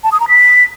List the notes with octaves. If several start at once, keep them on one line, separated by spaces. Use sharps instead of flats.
A5
D#6
A#5
B6